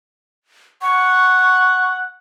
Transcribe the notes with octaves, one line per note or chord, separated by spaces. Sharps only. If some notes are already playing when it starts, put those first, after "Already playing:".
F#5 C#6